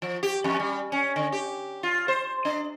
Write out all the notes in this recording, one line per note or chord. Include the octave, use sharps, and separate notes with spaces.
F3
G4
F2
G3
C#4
D3
G4
F4
C5
D4